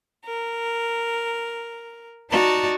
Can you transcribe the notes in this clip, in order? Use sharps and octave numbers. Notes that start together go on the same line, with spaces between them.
A#4
D#4 F#4 D5 A5 A#5